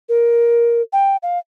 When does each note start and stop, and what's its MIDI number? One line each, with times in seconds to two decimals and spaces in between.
0.09 0.82 70
0.93 1.16 79
1.23 1.39 77